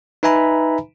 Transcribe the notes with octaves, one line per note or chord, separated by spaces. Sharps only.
D#4 B4 E5 G#5 A#5 B5